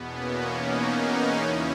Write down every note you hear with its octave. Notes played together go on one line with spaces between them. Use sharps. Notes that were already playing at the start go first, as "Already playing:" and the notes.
Already playing: E2 B2 B3
A#3 C#4
B3 D#4
E2 C#3 E3 C#4 E4